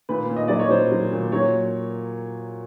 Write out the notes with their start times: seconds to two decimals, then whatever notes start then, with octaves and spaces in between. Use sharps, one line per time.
0.09 A#2 B4
0.30 A#2
0.36 D#5
0.48 F#3 D5
0.59 C#5
0.71 F#3 C5
0.92 F#3
1.12 A#2
1.32 F#3 C#5